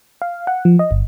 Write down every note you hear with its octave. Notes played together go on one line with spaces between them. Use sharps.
F5
F#5
F3
D#5
G1